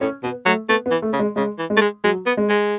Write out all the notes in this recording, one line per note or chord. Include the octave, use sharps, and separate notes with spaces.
A2 C#4
B2 B3
F#3 A3
A3 B3
B3
E3
A3
C#3
G#3
C#3 G#3
E3
G#3
A3
G#3
F#3 G#3
B3
G#3
G#3